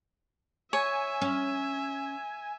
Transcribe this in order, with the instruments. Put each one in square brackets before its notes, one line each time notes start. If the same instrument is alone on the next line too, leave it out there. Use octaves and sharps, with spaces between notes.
[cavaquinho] C#5 [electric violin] E5 [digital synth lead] G#5
[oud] C#4